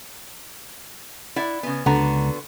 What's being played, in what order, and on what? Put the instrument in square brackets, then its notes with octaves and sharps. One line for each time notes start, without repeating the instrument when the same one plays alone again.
[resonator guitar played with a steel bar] E4 D5 F#5
C#3 B3
[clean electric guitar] C#2 F#5 A#5 [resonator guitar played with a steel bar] D3 B3 F#4